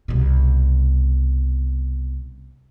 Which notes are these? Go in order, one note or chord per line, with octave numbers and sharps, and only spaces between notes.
C2 B2